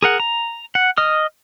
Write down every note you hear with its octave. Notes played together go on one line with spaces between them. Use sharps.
G#4 A#4 F#5
A#5
F#5
D#5 D#6 F6